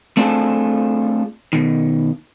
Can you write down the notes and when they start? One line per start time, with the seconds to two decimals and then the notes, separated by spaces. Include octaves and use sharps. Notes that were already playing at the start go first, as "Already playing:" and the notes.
0.17 A3 C4 D4 F4 G#4 A4
1.53 B2 D#3